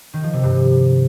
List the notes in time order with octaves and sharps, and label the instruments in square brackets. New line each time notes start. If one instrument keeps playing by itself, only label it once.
[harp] D#3
F3
C3
G2